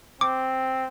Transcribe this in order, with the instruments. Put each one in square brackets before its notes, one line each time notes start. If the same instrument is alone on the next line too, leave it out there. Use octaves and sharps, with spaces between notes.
[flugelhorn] C4 [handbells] D6